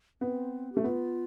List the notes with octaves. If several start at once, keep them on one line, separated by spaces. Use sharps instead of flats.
B3 C4
A3 G4
B3 F4